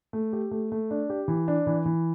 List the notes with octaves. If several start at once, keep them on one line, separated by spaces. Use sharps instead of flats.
A3
G4
A3
A3
D4
G4
E3
D4
E3
E3